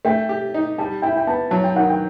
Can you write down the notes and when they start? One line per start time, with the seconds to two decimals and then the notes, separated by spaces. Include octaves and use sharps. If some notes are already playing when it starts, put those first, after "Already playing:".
0.05 A3 G5
0.29 G4
0.54 D#4
0.78 G3 A5
1.02 E4 G5
1.17 G5
1.27 B3 A5
1.51 F#3 A5
1.64 G5
1.75 D#3 F#5
1.90 G5